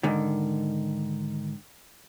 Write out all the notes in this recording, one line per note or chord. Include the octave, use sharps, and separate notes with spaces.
G#2 D3 D#3